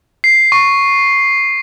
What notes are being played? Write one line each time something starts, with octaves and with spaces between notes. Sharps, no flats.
C7
C#6